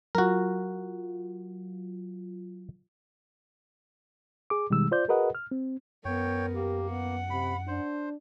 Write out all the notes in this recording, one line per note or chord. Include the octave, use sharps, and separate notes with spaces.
F#3 F4 F#4 A#4
G#4 D6
B2 D#3 G3 G#3 E6
F4 C5 D5 G6
F#4 G#4 A#4 B4 D#5 F#5
F6
C4
F#2 B3 A#4 C#5 G5
A#3 G4
B3 F#5
C3 B5
D4 C5